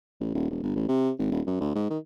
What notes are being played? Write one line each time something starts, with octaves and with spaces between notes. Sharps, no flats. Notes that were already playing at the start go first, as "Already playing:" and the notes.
A1
D#1
E1
G1
A1
C3
G#1
D#1
F#2
D2
G#2
D#3